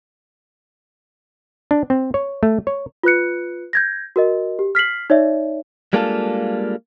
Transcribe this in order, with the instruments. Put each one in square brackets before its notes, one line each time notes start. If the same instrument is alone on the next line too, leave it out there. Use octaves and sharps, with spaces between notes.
[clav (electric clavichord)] D4
C4
C#5
A3
C#5
[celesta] F4 B4 F#6 C#7
G6 G#6 A#6
F#4 A#4 D#5
G4
F6 B6 C7 F#7
D#4 C#5 D5 E5
[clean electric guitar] G3 G#3 A#3 D4 F4 A4